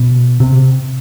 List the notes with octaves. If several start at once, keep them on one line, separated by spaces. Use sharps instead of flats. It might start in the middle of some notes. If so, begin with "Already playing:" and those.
Already playing: B2
C3